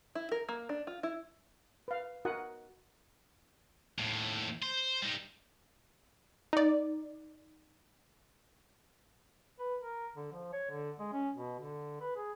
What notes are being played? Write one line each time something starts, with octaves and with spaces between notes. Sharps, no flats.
E4
A#4
A#3
D4
F4
E4
B4 F5
D#4 F#4 A#4 F#5 D#6
D#2 A2
C5
G3 D#4
D#4 D5
B4
A#4
D3
F3
C#5
D3
G#3
C#4
B2
D3
B4
G#4